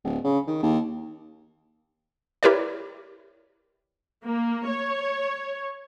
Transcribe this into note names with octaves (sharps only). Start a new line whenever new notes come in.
D1
C#3
D#3
D#2
E4 G4 A#4 B4 C#5 D5
A#3
C#5